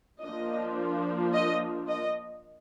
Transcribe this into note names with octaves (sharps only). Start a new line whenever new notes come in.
F3 A#3 D4 D#5
D#5
D#5